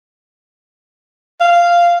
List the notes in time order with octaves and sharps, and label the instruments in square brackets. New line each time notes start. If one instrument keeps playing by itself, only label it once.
[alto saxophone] F5